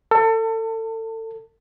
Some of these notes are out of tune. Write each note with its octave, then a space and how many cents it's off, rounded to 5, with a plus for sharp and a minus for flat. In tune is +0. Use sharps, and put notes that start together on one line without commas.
A4 +30